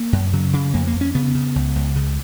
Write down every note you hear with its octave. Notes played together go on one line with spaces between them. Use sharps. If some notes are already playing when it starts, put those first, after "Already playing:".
Already playing: A#3
F#2
C#3 F#3
C#3
F2 A#3
A#3
F2
C#4
C#3 B3
C#3
C#2
C#2
C#3